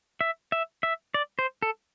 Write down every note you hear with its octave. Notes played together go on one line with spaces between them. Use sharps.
E5
E5
E5
D5
C5
A4